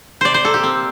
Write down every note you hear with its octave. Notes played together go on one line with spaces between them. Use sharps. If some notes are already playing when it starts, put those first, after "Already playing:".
C3 C5 D5
C5
A#3 A4
G4
C4